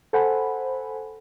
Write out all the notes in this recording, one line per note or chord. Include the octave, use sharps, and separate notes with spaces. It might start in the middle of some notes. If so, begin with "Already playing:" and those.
A4 C5 F#5 G#5 B5